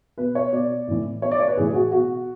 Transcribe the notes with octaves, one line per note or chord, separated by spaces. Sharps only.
B2 B4
C#5
B2 D5
A2 E3
B2 C#5
D5
C#5
B4
A2 E3 G#4
G#4
F#4
B2 F#4